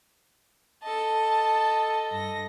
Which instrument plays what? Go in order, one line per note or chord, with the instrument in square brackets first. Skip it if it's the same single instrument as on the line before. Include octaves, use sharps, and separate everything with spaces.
[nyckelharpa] A4 D#5 [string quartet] A5
[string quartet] G2 A#6